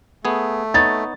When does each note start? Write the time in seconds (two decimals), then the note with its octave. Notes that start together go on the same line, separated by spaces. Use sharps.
0.25 A3 B3 G#4
0.74 B3 D#4 C#5 A6